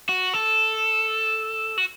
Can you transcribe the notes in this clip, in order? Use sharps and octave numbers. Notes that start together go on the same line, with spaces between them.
F#4
A4
F#4